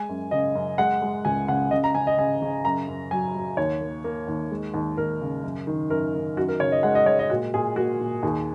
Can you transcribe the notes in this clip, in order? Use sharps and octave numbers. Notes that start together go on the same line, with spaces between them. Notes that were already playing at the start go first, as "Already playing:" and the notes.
Already playing: G#3 G#5
F#2
C#3 D#5
F#2
G#3 F#5
G#3
C#2 G#5
C#3 F#5
C#3 D#5
A#5
C#3 G#5
D#5
C#3 G#5
C#3
F#2 A#5
F#2
F#3 G#5
F#3
D#2 C#5
A#3
A#3
D#2
G#3
D#2
D#2 A#4
C#3
F#2
D#3
F#2 A#4
D#3
F#2 F#4
A#4
C#3 C#5
D#5
G#3 F#5
D#5
G#3 C#5
D#5
A#2 F#4
A#2 G#4
A#3 F#4
A#2
D#2 G#4